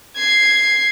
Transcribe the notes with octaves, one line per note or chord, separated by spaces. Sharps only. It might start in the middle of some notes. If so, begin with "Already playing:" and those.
G#6 C7